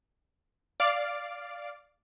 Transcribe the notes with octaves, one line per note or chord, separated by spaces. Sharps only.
D5 F5 D6